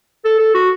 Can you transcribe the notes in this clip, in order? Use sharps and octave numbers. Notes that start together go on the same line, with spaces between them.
A4
A4
F#4